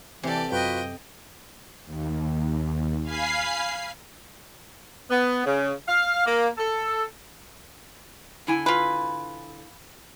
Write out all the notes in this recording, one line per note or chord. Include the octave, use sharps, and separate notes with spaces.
C3 E3 G4 A4 D5
F#2 F4 F#4 B4 D#5 G5
D#2
F5 G#5 B5 C7
B3
C#3
F5
A#3
A4
D3 E4 G#5
F4 B4